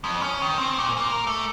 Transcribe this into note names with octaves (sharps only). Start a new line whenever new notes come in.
F2
C#4
D#3
C4
A#2
A#3
A#4
A3